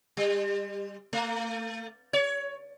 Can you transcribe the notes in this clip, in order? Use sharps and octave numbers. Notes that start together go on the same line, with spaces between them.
G3
A3
C#5